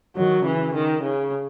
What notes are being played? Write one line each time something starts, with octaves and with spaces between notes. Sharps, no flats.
D#3 F#3
C#3 E3
D#3
C#3